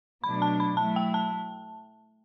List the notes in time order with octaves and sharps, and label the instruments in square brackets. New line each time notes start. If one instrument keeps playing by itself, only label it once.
[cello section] B2 F#3 A3 D4 [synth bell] B5
[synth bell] A5
B5
[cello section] F#3 A3 E4 [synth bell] A5
[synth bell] G5
A5